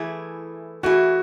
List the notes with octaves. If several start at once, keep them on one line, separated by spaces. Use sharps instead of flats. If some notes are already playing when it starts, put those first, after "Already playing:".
Already playing: E3 A3 E4 G#4
E3 A3 E4 F#4 G#4